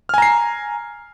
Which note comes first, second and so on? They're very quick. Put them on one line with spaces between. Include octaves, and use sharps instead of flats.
F6 G#5 A#5 C7